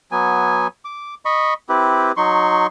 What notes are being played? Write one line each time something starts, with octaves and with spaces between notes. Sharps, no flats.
F#3 B3 G#5
D6
D#5 B5 C#6
C4 E4 G4 B4
F#3 D#4 C6 C#6